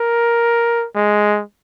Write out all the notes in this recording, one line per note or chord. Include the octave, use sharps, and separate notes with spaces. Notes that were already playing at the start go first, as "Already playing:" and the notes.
Already playing: A#4
G#3